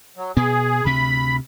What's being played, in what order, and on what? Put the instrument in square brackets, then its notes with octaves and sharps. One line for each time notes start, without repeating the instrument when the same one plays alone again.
[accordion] F#3
[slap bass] B2 B3 [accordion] G#4
[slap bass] D2 C3 [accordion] B5